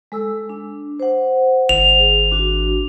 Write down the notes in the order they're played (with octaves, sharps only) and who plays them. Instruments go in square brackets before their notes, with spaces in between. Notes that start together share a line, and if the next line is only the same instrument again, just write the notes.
[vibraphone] G#3 A4 E6
D4
C5 F#5
[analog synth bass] G#1 [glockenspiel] F7
[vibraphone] G#4
D4 F#4